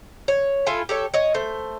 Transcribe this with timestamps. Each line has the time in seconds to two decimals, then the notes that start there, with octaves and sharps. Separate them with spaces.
0.28 C#5
0.66 E4 F4 A4 G#5
0.89 G4 A4 C#5
1.14 C#5 D#5
1.34 A3 C5